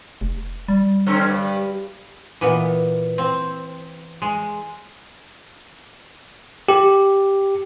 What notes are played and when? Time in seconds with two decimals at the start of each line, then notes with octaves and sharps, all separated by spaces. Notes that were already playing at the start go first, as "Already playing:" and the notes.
0.21 F1
0.68 G3
1.06 D3 C4 C#4
1.25 G2
2.41 A#2 E3 B3
3.18 C4
4.22 G#3
6.69 G4